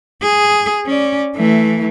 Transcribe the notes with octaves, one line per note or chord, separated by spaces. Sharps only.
G#4
C#4 D5
E3 A3